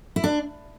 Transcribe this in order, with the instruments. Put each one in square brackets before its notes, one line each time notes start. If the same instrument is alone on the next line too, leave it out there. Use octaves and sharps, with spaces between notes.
[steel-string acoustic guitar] E4
D4